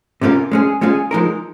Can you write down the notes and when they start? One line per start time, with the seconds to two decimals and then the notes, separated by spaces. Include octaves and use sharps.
0.21 C3 G3 C#4 F4 A#4
0.51 G#3 C#4 G#4
0.81 G#3 C#4 F4 G#4
1.11 F3 G#3 D#4 A#4